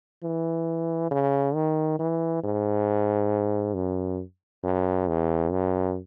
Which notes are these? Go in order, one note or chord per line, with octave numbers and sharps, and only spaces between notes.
E3
C#3
D#3
E3
G#2
F#2
F#2
E2
F#2